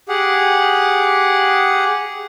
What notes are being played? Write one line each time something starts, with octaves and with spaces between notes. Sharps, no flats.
G4 G#4 F#5